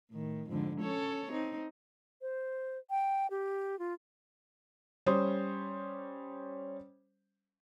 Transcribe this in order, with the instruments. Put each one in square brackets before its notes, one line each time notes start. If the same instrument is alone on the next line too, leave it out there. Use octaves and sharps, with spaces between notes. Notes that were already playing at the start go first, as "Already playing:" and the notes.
[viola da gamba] A2 D#3
F2 G#2 D3
C#4 A4 C#5
C4 D#4
[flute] C5
G5
G4
F4
[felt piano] G3 C#4 C5 D#6